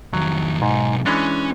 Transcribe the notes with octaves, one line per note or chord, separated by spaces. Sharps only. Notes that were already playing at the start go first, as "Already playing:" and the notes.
F2 D#3 F#3
B1 G#2
E3 G#3 C#4 D4